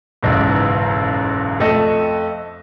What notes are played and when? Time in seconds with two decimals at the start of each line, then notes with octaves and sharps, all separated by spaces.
0.23 F#1 B1 E2 G#2
1.60 F2 A3 A4 D#5